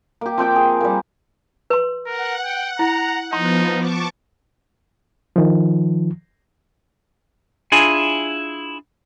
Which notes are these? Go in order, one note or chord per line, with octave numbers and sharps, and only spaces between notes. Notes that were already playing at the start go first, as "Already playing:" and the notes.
A#3 G4
F3 C4 G5 D6
G#4
G3 A#3
B4 C6
A#4 F#5
G5
E4 A#5
F3 B3 D#4 C6
A5 C#6 D6
D#3 F3
D4 E4 F4 G#4 G#5